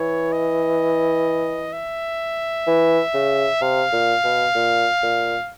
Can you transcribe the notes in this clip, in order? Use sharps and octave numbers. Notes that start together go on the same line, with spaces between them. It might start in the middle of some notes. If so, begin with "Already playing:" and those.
Already playing: E3 C#5
D#5
E5
E3
C#3
C3 F5
A#2
B2
A#2
A#2